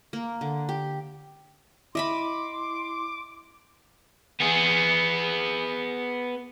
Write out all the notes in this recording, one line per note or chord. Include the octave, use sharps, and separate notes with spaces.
A#3
D3
G4
E4 D#5 E5 B5 C6 D6
B3 G#4